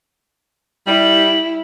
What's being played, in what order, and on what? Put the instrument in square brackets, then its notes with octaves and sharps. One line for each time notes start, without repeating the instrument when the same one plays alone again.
[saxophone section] G3 [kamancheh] E4 [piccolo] F#7